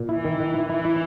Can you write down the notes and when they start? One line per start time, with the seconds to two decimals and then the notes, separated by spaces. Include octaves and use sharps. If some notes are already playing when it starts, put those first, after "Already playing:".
Already playing: A#2
0.09 E3 E4
0.25 D#3
0.40 D#3
0.54 E4
0.70 E3 E4
0.85 E4